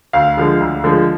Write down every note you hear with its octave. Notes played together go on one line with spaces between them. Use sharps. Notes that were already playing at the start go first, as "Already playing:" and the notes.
D2 F5
D3 F3 G#3
D2
D3 F3 G#3